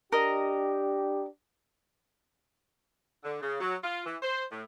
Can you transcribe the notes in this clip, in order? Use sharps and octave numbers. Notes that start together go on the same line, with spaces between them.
D4 G4 A#4 D#5
D3
C#3
F#3
F4
E3
C5
A2